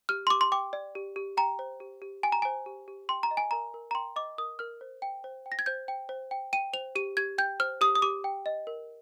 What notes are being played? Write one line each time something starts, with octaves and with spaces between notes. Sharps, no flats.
G4 F6
C6
G4 D6
C6
G5 D6
D5
G4
G4
G5 A#5
C5
G4
G4
G5 G#5
A#5
C5 G#5
G4
G4
G5 C6
A#5
D#5
G#5
A#4 A#5
A#4
A#5
G5 C6
D#5 D6
A#4 D#6
A#4 F6
C5
G5
C5
G5
A#6
G#6
C5 G6
G5
C5
G5
G5 D#7
C5 F7
G4 D#7
G4 G#6
G5 G6
C5 F6
G4 D#6
D#6
G4 D6
G5
D#5
A#4